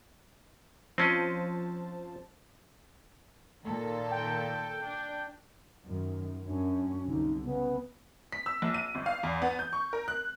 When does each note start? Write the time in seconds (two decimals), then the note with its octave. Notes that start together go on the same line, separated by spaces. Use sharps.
0.98 F3 C4 C#4 C5 D#5 A5
3.65 A#2 D#3 A4
4.11 G5
4.85 D4
5.86 F#2 D#3
6.47 F#2 C#4 D4
7.09 C2 D3 D#4
7.44 C#3 B3
8.32 B6
8.46 E6
8.62 A#1
8.74 D#7
8.95 G1
9.06 F5
9.23 E2
9.42 B3
9.59 G6
9.73 C#6
9.93 A#4
10.08 F#6